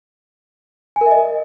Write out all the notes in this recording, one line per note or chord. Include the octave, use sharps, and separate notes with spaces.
G#5
A#4
E5
D#5